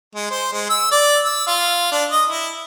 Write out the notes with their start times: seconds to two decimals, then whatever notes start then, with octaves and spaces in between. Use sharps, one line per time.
0.15 G#3
0.31 C5
0.53 G#3
0.70 E6
0.92 D5
1.25 E6
1.47 F4
1.92 D4
2.11 D#5
2.29 E4